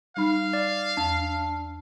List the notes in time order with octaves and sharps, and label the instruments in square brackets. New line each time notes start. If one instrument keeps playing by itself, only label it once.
[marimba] G3 D#4 B5 [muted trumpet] F5
[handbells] D5
[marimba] E2 [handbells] D4